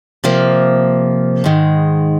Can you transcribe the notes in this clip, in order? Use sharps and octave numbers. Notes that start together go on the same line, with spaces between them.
C3 F3 A#3
G#2 D#3 G#3